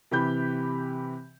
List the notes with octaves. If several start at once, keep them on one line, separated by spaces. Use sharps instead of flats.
C3 E3 G4 B5 G6